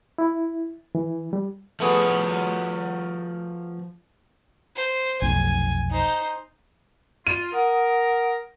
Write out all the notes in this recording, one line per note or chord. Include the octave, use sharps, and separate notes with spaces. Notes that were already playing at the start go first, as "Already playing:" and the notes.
E4
E3
G3
F3 A3 B3 F#4 G#4
C5
F1 B1 G#5
D#4 C5
F4 D#7
A#4 F#5 D#6